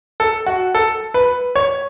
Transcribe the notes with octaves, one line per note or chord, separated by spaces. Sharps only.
A4
F#4
A4
B4
C#5